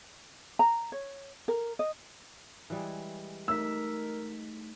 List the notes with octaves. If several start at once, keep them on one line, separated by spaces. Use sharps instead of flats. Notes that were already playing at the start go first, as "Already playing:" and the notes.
A#5
C#5
A#4
D#5
E3 G3 G#3
A3 D#4 A#4 E6 B6